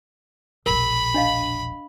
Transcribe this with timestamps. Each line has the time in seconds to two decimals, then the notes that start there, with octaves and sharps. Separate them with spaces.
0.66 E1 A#1 A#4 B5
1.14 D4 D#5 F5